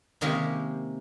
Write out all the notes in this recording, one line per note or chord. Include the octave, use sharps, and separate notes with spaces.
C3 D#3 G#3 A#3 C#4 G4